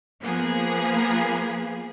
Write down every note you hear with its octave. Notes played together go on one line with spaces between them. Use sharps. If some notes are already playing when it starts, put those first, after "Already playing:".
F3 A#3 B3 G#4